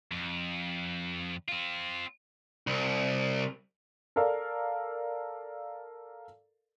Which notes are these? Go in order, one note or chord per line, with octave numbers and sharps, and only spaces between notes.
F2
C4 F4
C2
A4 A#4 D5 F5